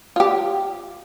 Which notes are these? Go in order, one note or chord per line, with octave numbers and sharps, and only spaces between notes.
F4 G4